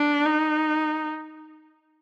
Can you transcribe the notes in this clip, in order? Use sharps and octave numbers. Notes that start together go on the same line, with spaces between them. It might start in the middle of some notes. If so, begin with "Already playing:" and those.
Already playing: D4
D#4